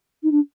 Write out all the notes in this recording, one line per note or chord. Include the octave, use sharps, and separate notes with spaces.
D#4
D4